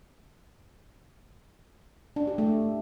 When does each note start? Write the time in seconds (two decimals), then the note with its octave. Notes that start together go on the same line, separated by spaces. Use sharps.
2.16 D4
2.27 G4
2.38 A3